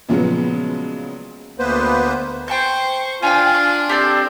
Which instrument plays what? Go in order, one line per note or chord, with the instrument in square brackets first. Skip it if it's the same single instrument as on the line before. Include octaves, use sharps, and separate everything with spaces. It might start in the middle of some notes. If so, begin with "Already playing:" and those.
[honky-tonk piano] A#2 C#3 F3 F#3 G#3 B3
[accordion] D2 A#3 B3 B4 C5
[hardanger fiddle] C5 C#6 [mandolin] G5 A5 G6
[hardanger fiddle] D4 [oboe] F4 [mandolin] G5 G#5
[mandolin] C6
[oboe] C4 [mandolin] G4 A4 D5